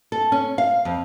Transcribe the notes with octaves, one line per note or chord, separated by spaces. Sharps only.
A4
C#4
F5
F2